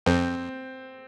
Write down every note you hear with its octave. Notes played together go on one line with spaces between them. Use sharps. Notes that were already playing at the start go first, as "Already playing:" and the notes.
F2 C4